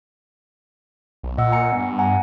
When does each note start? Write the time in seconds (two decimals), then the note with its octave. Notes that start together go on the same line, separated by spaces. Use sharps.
1.23 B1
1.38 A#2 D#5 F#5 E6
1.52 G#5 A#5 C#7
1.72 G2 B3
1.99 F#5 G#5 A#5